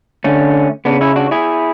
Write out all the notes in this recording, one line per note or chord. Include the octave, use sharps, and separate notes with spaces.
D3 A3 C#4
C#3 B3 D4
C#4 E4
D4 F#4
E4 G#4